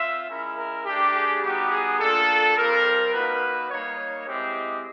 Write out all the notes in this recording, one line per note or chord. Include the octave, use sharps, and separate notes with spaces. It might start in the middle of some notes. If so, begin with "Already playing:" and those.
Already playing: C4 F4 E5
G#3 C#4 E4 A#4
A#4
A3 D4 G4
G#4
G3 B3 D#4 F#4 G4
G#4
A#3 D4 F4 A4
G3 C4 F4 A#4
A#3 D#4 F#4 B4
G3 A#3 D#4 C#5
G#3 C4 E4 G4 D#5